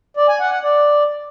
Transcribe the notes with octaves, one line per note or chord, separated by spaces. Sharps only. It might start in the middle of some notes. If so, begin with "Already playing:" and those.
D5
G#5
F#5
F#5
D5